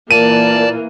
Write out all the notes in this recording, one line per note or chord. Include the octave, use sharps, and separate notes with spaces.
A#2 E3 A#3 D5 A5 D#7